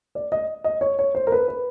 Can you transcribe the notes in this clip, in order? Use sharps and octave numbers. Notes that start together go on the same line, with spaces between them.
D5
D#5
D#5
C#5
C#5
C5
A#4
B4
B4